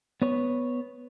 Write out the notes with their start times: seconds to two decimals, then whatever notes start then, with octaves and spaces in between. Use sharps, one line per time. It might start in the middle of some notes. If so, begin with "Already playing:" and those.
0.22 B3 B4 C#5